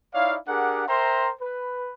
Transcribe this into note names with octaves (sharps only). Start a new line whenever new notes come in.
D#4 E4 C#5 D5 F5
D4 G4 G#4 A#4 F#5
A#4 C5 E5 G5 A#5 C6
B4